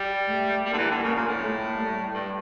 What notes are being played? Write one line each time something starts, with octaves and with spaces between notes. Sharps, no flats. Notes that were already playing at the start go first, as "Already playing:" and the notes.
Already playing: G3
A3
G3 A#3
D3
E3
D3
C#3 A#3
A#2
A2
A3
G3
G2